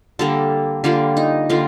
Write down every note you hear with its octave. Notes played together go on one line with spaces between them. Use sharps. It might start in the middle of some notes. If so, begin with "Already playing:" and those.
D3 G3 A#3 A4
D3 G3 A#3 F4
D#4
D3 G3 A#3 F4